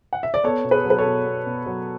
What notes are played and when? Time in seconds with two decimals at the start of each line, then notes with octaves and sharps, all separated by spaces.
0.13 F#5
0.23 E5
0.34 D5
0.44 B3 A4 C#5
0.64 B2
0.71 G#4 B4
0.84 F#3
0.90 B4
0.98 A4 C#5
1.06 B2
1.26 B3
1.46 B2
1.66 F#3